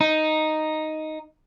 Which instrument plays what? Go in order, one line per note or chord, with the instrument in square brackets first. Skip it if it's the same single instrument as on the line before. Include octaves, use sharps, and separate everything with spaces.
[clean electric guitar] D#4